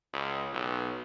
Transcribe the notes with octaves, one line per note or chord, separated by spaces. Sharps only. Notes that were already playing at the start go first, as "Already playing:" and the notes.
C#2
B1